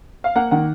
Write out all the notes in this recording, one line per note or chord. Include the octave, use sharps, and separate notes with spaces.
F5
A#3 F#5
D#3 F#5